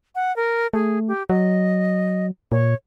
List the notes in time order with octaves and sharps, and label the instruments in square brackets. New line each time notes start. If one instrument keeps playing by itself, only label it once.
[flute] F#5
A#4
[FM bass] A3 [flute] G#4
[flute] G4
[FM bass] F#3 [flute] D#5
[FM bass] A#2 [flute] C#5